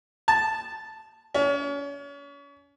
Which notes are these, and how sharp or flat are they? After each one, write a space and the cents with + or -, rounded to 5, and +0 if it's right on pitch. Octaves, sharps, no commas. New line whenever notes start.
A5 -5
C#4 +35